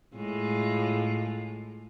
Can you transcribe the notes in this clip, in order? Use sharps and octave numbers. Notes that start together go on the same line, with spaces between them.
A2 G#3 F4